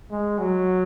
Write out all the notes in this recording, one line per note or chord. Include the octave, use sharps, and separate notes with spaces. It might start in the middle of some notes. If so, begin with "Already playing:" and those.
G#3
F#3